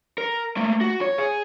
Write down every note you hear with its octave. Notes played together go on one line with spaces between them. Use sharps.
A#4
A3 A#3
F#4
C#5
G#4